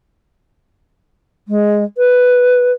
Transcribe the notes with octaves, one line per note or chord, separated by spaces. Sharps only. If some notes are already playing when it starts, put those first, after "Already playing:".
G#3
B4